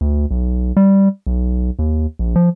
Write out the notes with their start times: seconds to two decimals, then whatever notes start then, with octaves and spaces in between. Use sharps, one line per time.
0.01 D2
0.31 B1
0.77 G3
1.27 B1
1.79 D#2
2.19 A#1
2.36 F3